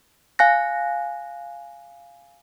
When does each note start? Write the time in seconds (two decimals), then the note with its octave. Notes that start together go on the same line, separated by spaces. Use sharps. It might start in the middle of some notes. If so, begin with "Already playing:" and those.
0.39 F5 G#5 F#6 A#6